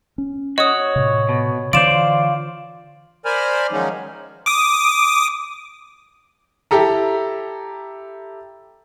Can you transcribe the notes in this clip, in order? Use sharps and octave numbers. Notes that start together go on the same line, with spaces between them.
C#4
F#4 C#5 D#5 D#6
A2 C3
B2
D3 E3 F4 C5 D5 D7 E7
A#4 C5 D5 G#5 B5 F6
D#3 F3 F#3 G#3 C#4 D#4
D6 D#6
E4 G4 A4 A#5